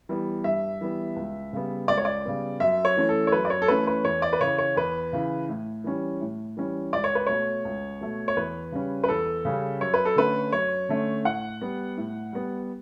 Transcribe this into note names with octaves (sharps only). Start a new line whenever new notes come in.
E3 G3 B3
G2 E5
E3 G3 B3
C#2
C#3 G3 B3
C#2 D5
C#5
D5
C#3 G3 B3
F#2 E5
C#5
E3 A3 C#4
A4
C#5
F#2 B4
D5
C#5
A4
E3 A3 C#4 B4
B4
E2 C#5
D5
B4
C#3 E3 C#5
C#5
E2 B4
C#3 E3
A2
E3 G3 C#4
A2
E3 G3 C#4
C#2 D5
C#5
B4
B2 A3 C#5
C#2
B2 A3
C#5
E2 B4
C#3 G3 C#4
B4
E2 A4
C#3 G3 C#4
F#2 C#5
B4
A4
D3 A3 C#4 B4
F#2 C#5
D3 A3 C#4
A2 F#5
G3 B3
A2
G3 B3